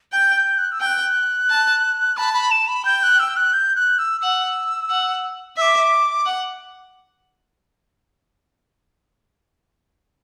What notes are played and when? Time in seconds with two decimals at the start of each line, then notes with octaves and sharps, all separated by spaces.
0.13 G5 G6
0.36 G6
0.58 F#6
0.72 E6
0.81 G5 G6
0.86 F#6
1.50 A5
2.17 A5 B5
2.34 B5
2.51 A5
2.68 B5
2.85 G5 G6
3.03 F#6
3.20 E6
3.37 F#6
3.53 G6
3.76 F#6
3.99 E6
4.21 F#5 E6
4.90 F#5
5.57 E5 E6
5.62 D6
6.26 F#5